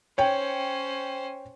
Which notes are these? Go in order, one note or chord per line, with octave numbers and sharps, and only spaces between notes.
C#4 C5 C#5 G5